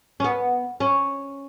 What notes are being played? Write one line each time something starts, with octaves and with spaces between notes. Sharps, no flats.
C#4
B3
C#4